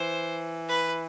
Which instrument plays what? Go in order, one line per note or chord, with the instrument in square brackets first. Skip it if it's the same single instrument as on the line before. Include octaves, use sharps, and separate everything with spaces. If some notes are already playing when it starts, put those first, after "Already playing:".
Already playing: [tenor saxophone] E3 [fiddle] C5
[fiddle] B4